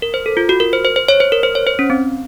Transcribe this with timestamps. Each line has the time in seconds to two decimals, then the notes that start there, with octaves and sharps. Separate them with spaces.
0.02 A#4
0.14 C5
0.26 A4
0.37 F4
0.49 F#4
0.60 A#4
0.73 C5
0.85 C5
0.96 C5
1.08 C#5
1.20 C5
1.32 A#4
1.43 C5
1.55 C#5
1.67 C5
1.79 C#4
1.90 C4